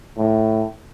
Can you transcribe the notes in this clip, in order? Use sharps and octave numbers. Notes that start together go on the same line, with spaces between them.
A2